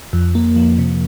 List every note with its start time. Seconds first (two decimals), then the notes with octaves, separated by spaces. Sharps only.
0.13 F2
0.35 A#3
0.56 F3
0.78 C3